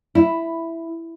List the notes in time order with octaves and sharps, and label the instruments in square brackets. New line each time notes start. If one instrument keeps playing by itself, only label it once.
[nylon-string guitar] E4